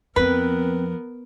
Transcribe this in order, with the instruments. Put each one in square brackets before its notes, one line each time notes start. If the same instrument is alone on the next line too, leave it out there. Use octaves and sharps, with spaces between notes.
[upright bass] F2 F3 [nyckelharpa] B3 A#4 [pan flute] C4 [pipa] B4